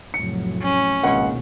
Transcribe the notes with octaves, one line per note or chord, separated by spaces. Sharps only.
F1 A2 F#3 C#7
C#4
G#1 C#2 B2 A#3 F#5